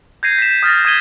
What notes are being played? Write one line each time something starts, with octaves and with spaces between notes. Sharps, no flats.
G6 G#6 A#6 C7 D#7
B6 E7
D#6 F6 G6 A6 A#6
D#6 G#6 D#7 G7